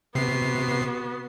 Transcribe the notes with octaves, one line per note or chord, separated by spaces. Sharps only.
C3 B3 F#4 C7